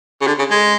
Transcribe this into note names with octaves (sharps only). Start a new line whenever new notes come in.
C#3
D3
C#3
G#3